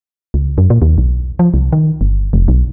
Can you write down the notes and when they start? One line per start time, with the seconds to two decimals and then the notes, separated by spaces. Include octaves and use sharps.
0.34 C#2
0.58 F#2
0.70 A#2
0.82 D#2
0.98 B1
1.39 F3
1.54 C2
1.72 D#3
2.01 G1
2.33 F1
2.48 B1